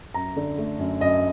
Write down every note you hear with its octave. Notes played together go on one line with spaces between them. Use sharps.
F#2 A#5
D3
A3
F#2
F#2 D#5